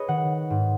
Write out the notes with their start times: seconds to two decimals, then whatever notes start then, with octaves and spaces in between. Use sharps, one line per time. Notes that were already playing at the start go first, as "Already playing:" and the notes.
Already playing: G#4 B4 C#5 D#5
0.08 D#3 F#5
0.50 G#2